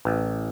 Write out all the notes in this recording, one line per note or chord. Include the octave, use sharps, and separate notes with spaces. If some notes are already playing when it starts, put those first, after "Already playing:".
A1